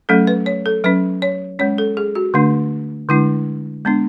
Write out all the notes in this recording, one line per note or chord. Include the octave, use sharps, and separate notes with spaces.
F#3 A3 C#4 A4
B4
C#5
A4
F#3 C#4 B4
C#5
G#3 C#4 C#5
A4
G#4
F#4
D3 A3 D4
D3 G#3 D4 E4
G#3 B3 D4